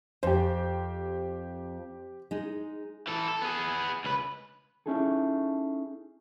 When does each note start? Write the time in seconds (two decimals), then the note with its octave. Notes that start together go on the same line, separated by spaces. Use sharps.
0.23 F2 G4 C5
2.31 G#3 D#4
3.07 E3 A4
3.28 A4
3.42 B3 G#4
4.04 C#2 B4
4.86 C#4 D#4 E4 G#4 A4